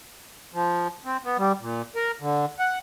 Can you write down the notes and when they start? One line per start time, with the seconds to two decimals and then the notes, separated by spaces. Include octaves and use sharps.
0.54 F3
1.05 C4
1.25 B3
1.38 G3
1.61 A#2
1.96 A#4
2.21 D3
2.59 F#5